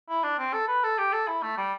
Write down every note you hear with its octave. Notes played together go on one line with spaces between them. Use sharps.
E4
D4
C4
A4
B4
A4
G4
A4
E4
A3
G3